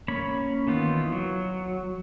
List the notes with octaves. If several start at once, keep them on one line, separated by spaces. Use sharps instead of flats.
A#3 C#4 C#5 B5
D#3 E3 B3 D#4 F4
F#3